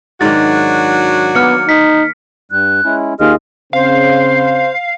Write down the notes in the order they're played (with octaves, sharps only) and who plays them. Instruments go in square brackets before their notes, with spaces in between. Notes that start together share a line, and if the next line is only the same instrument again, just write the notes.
[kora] G#2 D#3 [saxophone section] F#3 D4 F#4 [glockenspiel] A6
[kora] A#3 [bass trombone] B3 [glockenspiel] F6 C#7
[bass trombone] D#4 [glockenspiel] B6
[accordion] G2 G3 [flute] F#6
[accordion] G#3 C#4 E4
[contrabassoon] D#2 [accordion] F4 G#4 D#5 [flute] F6
[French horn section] C#3 C4 [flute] C5 [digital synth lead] F5